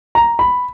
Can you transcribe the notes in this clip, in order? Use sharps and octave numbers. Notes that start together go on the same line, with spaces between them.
A#5
B5